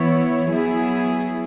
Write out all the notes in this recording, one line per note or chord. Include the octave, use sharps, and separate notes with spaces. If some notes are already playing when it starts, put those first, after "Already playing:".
Already playing: E3 B3 E4 C#5
F#3 B3 E4 G#4